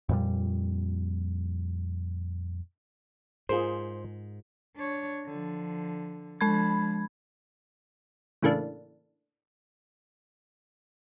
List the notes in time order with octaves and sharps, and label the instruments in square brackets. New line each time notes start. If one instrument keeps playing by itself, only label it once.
[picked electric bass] F2 A#2 G3
[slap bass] G#2 [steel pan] F4 G#4 A#4 [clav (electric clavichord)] C5
[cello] D4 C#5
D3 F3
[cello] F3 D4 [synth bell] G#3 B5 G#6
[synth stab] A2 C#3 E3 A3 A#3 D4